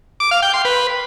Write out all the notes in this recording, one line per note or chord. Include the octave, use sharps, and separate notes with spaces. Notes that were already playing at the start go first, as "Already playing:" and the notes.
D6
F5
G5
C6
B4